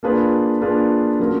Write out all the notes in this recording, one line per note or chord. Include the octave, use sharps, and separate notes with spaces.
A#3 D4 F4 G#4 B4
A#3 D4 F4 G#4 B4
F#3 A3 C#4 F4 A#4